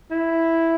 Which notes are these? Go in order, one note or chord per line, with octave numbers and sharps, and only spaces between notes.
E4